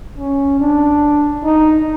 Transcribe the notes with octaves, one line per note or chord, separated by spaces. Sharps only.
C#4
D4
D#4